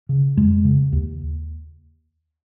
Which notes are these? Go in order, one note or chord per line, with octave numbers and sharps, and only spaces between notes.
C#3
F2 G#3
C#3
D#2